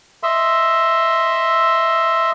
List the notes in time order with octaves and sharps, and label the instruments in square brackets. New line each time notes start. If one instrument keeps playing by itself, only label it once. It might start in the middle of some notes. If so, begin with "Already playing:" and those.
[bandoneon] D#5 E5 C6 E6